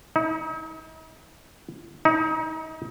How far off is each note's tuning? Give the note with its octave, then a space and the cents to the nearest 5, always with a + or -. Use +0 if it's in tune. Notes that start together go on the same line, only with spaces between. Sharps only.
D#4 +45
D#4 +35